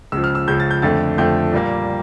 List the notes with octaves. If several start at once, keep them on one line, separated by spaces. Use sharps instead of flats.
C#2 C#3 F3 E6
F6
E6
C#2 C#3 F3 G6
A6
G6
F2 D3 F3 A3 A6
F2 D3 F3 A3 G6
A#2 G3 A#3